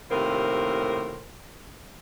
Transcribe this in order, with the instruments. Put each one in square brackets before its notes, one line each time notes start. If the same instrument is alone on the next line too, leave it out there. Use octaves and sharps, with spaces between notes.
[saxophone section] D#2 A2 C3 F4 A#4 C5